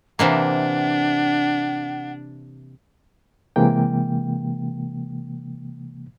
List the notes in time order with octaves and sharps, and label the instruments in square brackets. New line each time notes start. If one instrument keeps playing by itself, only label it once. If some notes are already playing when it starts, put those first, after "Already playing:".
[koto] C3 E3 A#3 [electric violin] D4 [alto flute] F#5
[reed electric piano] C3 E3 G#3 A#3 G5